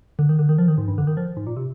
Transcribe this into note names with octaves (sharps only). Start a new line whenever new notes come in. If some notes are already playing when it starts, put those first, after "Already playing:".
D3
D#3
D3
D#3
F3
D#3
G#2
G2
D3
D#3
F3
G#2
A#2
C3